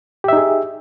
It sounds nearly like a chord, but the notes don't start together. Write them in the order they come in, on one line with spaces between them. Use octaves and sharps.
G4 E5 D#4 G#4